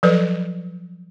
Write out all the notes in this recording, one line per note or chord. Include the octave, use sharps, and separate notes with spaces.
F3 F#3 A4 B4